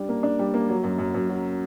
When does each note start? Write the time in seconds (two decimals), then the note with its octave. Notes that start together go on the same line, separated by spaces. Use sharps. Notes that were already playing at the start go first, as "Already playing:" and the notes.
Already playing: G3 D4
0.09 A#3
0.23 D4
0.39 G3
0.54 A#3
0.69 F#3
0.84 F#2
0.99 F#2
1.14 F#2
1.29 F#3